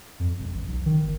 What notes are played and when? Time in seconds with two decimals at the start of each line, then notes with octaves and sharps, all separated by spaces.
0.19 F2
0.39 E1
0.55 A1
0.67 B1
0.86 D#3
1.01 G1